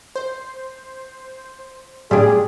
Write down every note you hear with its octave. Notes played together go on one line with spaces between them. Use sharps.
C5
A2 G3 D4 G#4